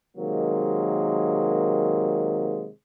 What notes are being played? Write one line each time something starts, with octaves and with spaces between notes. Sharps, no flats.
C3 D#3 F#3 G#3 A#3